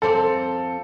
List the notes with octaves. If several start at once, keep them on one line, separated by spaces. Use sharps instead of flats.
F2 C4 A4 D5